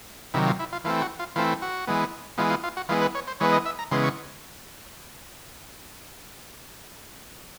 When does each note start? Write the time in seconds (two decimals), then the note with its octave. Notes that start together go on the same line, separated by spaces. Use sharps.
0.34 C3 D#3 F#3 E4
0.47 F4
0.60 E4
0.73 F4
0.84 E3 A3 C4 F4
1.02 F#4
1.19 F4
1.36 E3 A3 C4 F4
1.62 F#4
1.87 E3 G#3 B3
2.38 E3 G#3 B3 F4
2.50 F4
2.64 F4
2.77 F#4
2.89 E3 G#3 B3 F4
3.01 B4
3.15 C#5
3.27 C5
3.40 E3 G#3 B3 C#5
3.52 D#5
3.66 E5
3.79 A#5
3.91 C#3 E3 G#3 B3 C6
4.03 C#6